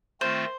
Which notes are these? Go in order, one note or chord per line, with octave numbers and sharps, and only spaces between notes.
D#3 A3 C4 F4 C5